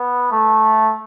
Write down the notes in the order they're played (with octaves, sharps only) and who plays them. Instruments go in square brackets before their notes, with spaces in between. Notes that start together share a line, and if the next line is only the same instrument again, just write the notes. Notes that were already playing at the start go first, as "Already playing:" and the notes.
Already playing: [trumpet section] B3
A3